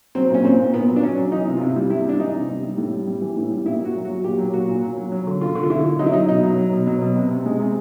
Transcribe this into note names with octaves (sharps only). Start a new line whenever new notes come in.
F#3 C4
A#2 C#4
A#2 C4
A#2
A#2 B3
F#3
D4
F#3 C#4
F#3
E3 D#4
C3
F4
C3 E4
G3
C3 E4
G3 D4
E3 D#4
C3
G3
G3
A2
G3
G3
E3
A2
G3
A#2 E4
A#2 F#4
F#3
F#4
F#3
A#2 G4
F#3
A#2 F#4
A#2
F#3
F#3
F#3
D3
D3 F4
D3
F4
D3 E4
D3
F#3 D#4
E4
F#3 D#4
B2 D#4
F#3
F#3
B2
F#3
B2
C3
C3
G#3
C3